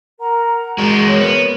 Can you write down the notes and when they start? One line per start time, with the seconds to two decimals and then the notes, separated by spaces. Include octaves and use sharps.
0.19 A#4 F#5 A#5
0.78 G#3 F#4
1.07 A#4 C#5
1.20 B3